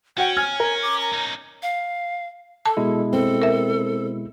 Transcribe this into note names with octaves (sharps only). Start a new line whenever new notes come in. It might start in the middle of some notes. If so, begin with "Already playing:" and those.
C#4 F#4 F#5 G5
G#5 F6 G#6
A#4
D6
A#5
C#4 D#4
F5
A4 A5
B2 G#3 E4
C4 A4
A#4 E5